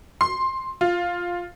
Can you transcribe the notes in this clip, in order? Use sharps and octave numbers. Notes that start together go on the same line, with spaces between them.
C6
F4